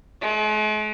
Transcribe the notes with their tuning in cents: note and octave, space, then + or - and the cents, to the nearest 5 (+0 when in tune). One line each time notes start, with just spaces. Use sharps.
G#3 +45